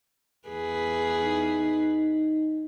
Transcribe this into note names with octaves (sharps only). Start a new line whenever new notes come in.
E2 G#4 B4
D#4